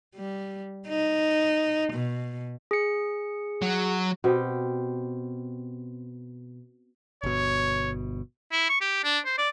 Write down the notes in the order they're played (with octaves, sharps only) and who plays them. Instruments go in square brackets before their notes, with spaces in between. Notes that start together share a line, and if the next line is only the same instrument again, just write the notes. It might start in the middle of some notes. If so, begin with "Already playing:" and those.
[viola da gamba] G3
D#4
B2
[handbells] G#4 C#7
[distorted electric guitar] F#3
[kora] B2 C4 G4
[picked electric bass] G1 B2 [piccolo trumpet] C#5
[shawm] E4
C#6
G4
D4
C5
D5